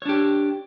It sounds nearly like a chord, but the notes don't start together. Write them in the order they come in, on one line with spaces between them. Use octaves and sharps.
C#5 D4 G4